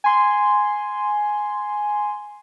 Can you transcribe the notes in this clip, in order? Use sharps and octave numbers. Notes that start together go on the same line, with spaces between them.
G#5 C6